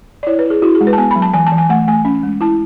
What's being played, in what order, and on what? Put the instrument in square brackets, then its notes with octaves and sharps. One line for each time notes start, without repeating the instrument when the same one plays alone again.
[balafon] D5
E4 C#5
B4
E4 G#4
E4 F#4
G#4
G#3
B4
A5
B3 G#5
B5
F#3
A5
E3 G#5
A5
E3
G#5
A3 F#5
A3 G#5
C#4
G#3
E4 A5